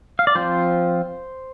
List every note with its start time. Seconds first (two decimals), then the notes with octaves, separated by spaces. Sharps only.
0.19 F5
0.27 D5
0.35 F3 C4 F4 C5